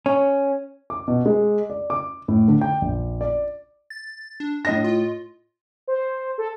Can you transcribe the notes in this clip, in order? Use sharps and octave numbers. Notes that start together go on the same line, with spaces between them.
C#4
D6
B2
G#3
D5
D6
A2
D3
G5
A#1
D5
A6
D4
A2 D4 D#5 A#6
F4
C5
A4